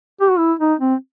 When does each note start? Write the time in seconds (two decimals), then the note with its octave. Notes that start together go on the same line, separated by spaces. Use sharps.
0.21 G4
0.30 F#4
0.38 E4
0.60 D#4
0.80 C4